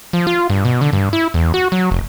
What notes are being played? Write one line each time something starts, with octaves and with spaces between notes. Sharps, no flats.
F3
F4
G2
B2
D3
G2
E4
E2
F#4
F#3
F1